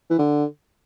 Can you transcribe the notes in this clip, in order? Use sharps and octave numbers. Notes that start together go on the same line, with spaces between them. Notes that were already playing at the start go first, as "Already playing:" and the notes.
E3
D3